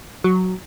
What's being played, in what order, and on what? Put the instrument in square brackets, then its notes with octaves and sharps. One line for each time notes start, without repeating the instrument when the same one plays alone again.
[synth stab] F#3